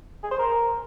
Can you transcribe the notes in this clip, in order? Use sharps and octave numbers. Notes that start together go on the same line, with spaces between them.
G#4
C5
A#4